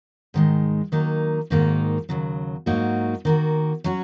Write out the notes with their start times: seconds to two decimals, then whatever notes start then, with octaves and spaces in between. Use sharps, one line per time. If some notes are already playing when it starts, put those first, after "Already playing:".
0.34 G#2 D#3 G#3
0.92 D#3 F#3 A#3 D#4
1.50 G#2 D#3 A#3 D#4 F#4
2.09 D#2 C#3 F#3
2.66 G#2 F#3 A#3 D#4 F#4
3.25 D#3 A#3 F#4
3.84 F#3 C#4 F#4